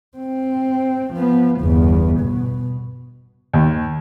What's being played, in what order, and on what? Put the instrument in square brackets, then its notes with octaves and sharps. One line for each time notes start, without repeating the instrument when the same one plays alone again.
[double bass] C4
F3 B3
G1 E2
B2
[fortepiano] D#2